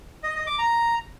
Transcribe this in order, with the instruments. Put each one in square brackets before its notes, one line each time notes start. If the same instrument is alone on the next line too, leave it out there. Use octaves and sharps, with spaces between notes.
[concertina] D#5
D#5
D6
A#5